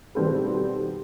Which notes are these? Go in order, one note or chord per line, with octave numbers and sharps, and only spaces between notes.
B2 D#3 G3 C4 A4 B4